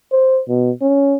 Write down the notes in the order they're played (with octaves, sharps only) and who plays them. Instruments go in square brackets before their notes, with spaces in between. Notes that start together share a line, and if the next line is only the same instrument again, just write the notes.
[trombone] C5
B2
C#4